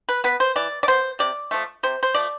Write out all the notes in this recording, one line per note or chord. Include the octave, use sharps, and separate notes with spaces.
B4
B3 B4
C5
E3 D5
D5
B3 C5
C3 D5
F3 A3
C3 C5
C5
F3 A3 D5